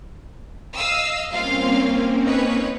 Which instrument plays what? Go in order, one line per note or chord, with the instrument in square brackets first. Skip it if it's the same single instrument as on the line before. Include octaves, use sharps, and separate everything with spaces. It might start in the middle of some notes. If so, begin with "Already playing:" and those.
[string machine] D#5 [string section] F5 D#6 E6
[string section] G3 F4 F5 [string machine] A#3 C4 C#4
[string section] D#4 B4 C#5